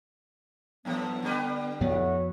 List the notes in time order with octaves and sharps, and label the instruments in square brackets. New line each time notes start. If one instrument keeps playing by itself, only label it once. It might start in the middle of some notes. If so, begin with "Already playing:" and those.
[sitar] F#2 A2 F3 [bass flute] B3
[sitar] D3 G3 B4
[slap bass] F2 B3 [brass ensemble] A3 E4 F#4 [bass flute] C#5